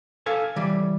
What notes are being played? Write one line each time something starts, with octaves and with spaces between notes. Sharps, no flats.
A4 F5 G#5
E3 G3